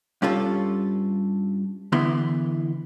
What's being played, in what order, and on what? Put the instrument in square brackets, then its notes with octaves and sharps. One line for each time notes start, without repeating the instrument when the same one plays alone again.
[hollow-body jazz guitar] G2 C#4 F4 A4
D3 E3 B3 E4 C6